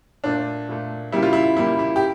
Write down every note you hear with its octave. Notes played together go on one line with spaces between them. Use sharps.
A#2 A3 D4
A#2 A3
C#3 G3 A#3 E4
F4
E4
C#3 G3 A#3 E4
E4
G4